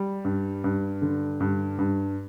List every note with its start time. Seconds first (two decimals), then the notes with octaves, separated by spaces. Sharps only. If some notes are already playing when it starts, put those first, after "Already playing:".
Already playing: G3
0.25 G2
0.64 G2
1.02 D3
1.40 G2
1.79 G2